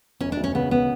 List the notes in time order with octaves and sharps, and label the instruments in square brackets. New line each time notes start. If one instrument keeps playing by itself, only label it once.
[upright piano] E1 [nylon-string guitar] C#4
[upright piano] D2 [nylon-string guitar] D4
[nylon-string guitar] C#4
[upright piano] C#3 [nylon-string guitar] B3
[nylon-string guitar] B3